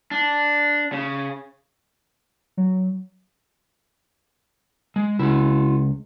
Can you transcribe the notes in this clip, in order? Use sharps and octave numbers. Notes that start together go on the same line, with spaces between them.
D4
C#3
F#3
G#3
C#2 E4 F#4